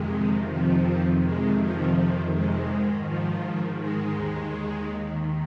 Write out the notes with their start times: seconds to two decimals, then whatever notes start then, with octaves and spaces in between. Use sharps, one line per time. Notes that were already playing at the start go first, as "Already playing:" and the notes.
Already playing: F2 C3 D#3 G#3
0.51 F3
1.24 F2 C3 D#3 G#3
1.60 F3
2.34 G#3
2.70 G#2 D#3
3.07 F3
3.80 G#3
4.16 D#2 D#3